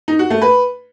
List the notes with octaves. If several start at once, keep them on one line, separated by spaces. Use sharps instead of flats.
D#4
F#4
A3
B4